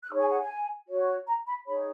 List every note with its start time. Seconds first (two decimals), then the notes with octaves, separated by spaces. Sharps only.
0.03 F#6
0.10 D#4 G#4 C#5 E6
0.19 G#5
0.30 F#5
0.39 G#5
0.88 F#4 C#5
1.27 A#5
1.47 B5
1.66 D#4 G#4 C#5 B5